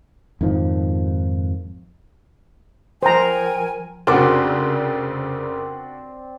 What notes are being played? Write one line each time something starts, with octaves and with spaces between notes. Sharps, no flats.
F2 G#2 D#3 F3
F3 A#4 C5 G5 G#5 A#5
F1 C#3 C4 D4 F#4 A#4 D5 D6